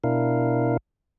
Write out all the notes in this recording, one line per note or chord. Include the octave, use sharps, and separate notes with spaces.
B2 D4 E4 A#4 F5